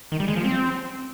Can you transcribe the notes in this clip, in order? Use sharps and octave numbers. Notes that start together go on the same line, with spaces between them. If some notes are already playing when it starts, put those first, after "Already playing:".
D#3
G3
G#3
F3
C4